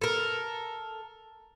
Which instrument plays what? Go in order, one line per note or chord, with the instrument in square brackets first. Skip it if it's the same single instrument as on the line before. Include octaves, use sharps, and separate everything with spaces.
[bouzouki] A4 A#4